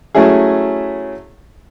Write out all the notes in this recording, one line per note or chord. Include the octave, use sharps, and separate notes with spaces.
F#3 A3 C#4 E4 G#4